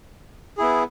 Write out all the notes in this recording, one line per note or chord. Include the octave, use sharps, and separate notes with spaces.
B3 E4 G#4